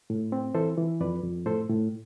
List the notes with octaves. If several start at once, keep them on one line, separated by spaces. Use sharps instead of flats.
A2
C4
E3 A4 C5
E3
F2 B4 D5
F2
A2 A4 C5
A2